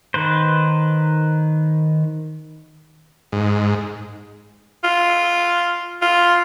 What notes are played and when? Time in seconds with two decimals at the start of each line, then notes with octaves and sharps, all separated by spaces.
0.14 D#3 B4 C5
3.32 G#2
4.84 F4
6.02 F4